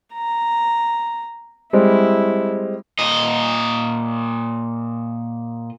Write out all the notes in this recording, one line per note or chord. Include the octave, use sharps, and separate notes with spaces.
A#5
G3 G#3 C4 E4
A#2 D#5